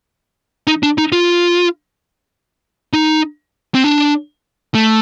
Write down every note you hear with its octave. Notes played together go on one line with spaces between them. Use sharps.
D#4
D4
D#4
F4
D#4
C4
D4
A3